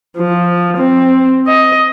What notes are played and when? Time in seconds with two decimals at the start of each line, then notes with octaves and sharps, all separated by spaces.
0.18 F3
0.78 C4
1.47 D#5